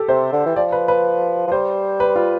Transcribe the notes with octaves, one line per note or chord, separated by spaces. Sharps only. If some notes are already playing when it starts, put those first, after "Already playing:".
Already playing: G4 A4
C3 C5
D3
E3
F3 D5
B4
B4
F3
G3 C5
B4
F4